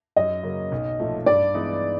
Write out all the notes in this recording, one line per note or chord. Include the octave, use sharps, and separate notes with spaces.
F#2 D#5
C#3 F#3 A#3
B1
A#2 F3 A3
G2 D5
E3 G#3 B3 D#4